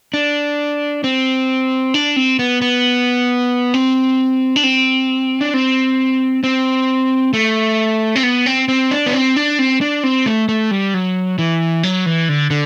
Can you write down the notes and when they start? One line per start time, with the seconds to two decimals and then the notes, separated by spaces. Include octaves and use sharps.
0.14 D4
1.04 C4
1.94 D4
2.16 C4
2.39 B3
2.62 B3
3.74 C4
4.56 D4
4.63 C4
5.41 D4
5.54 C4
6.44 C4
7.34 A3
8.16 C4
8.23 B3
8.46 C4
8.68 C4
8.91 D4
9.06 B3
9.13 C4
9.36 D4
9.59 C4
9.81 D4
10.04 C4
10.26 A3
10.49 A3
10.71 G3
10.94 F#3
11.39 E3
11.83 F#3
12.06 E3
12.29 D3
12.51 D3